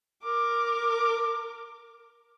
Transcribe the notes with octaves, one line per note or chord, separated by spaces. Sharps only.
A#4 D6